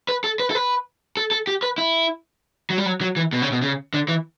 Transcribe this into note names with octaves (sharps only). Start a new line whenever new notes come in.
B4
A4
B4
A4
B4
A4
A4
G4
B4
E4
F#3
G3
F#3
F#3
E3
B2
C#3
B2
C#3
D3
E3